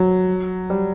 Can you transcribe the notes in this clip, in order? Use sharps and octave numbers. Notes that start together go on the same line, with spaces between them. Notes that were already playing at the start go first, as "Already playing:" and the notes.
Already playing: F#3
G3